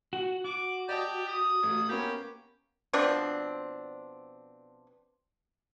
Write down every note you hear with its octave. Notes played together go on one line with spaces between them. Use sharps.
F#4
F#4 D6
G4 D5 D#5 A5
D#6
A1
A#3 B3 C#4 G4
B2 F3 C4 D4